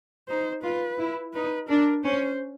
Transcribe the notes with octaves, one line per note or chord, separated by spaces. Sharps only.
D#4 C5
F4 B4
E4
D#4 B4
D4 A#4
C#4 C5